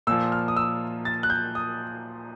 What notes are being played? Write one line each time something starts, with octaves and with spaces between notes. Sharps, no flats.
A#2 F3 E6
F6
D#6
E6
A6
F#6
G6
D#6